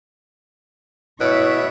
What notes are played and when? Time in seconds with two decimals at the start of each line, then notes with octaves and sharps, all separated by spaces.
1.20 B2 E4 C#5 E5